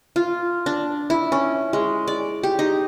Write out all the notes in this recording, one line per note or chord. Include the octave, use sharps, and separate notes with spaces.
F4
D4
E4
C#4
G#3
D5
G4
D#4